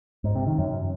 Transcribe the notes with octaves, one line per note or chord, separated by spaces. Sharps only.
G#2
C3
D#3
F#2